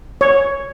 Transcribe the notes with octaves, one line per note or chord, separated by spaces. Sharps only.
C#5